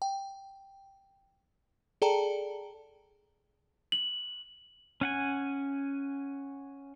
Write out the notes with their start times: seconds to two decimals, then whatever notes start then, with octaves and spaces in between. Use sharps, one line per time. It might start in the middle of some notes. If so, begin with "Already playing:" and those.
0.02 G5
2.02 G#4 A4 D5 G5 A5 A#5
3.92 F#7
5.01 C#4 F#5 G#5